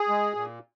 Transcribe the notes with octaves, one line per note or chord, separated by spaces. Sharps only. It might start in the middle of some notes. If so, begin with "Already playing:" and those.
Already playing: G#4
G#3
A#2